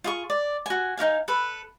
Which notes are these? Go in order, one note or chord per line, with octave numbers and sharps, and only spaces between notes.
F4 G#4 C#6
D5
F#4 G#5
D#4 F#4 F5 G#5
A4 B4